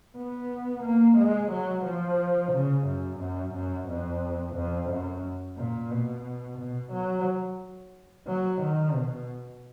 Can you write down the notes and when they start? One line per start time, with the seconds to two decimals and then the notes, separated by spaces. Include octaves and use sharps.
0.16 B3
0.83 A#3
1.18 G#3
1.51 F#3
1.85 F3
2.52 C#3
2.87 F#2
3.20 F#2
3.54 F#2
3.88 F2
4.56 F2
4.90 F#2
5.57 A#2
5.91 B2
6.58 B2
6.93 F#3
8.28 F#3
8.62 D#3
8.95 B2